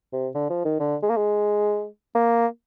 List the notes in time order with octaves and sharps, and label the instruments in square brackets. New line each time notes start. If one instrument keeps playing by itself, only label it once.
[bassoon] C3
D3
F3
D#3
D3
G#3
A#3
G#3
A#3